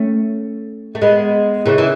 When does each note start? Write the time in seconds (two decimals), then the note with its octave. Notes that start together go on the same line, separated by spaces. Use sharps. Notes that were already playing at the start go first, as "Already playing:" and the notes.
Already playing: A3 C#4
0.95 A3
1.02 G#3 B3
1.66 C#3 E3
1.78 E3